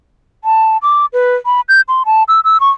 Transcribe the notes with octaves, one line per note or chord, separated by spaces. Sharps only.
A5
D6
B4
B5
G6
C6
A5
E6
E6
C#6